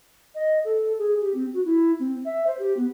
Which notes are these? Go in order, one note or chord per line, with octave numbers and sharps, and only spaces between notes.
D#5
A4
G#4
G4
C4
F#4
E4
C4
E5
C5
G4
B3